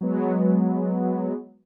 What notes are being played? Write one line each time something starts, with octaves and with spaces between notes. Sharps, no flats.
F#3 G#3 B3